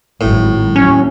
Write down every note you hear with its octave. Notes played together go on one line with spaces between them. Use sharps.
G#1 A2 F#3
D#2 F#3 C#4